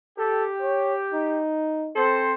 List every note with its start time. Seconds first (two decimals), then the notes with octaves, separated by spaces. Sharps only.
0.18 G4 A4
0.61 C#5
1.13 D#4
1.96 C4 A4 C5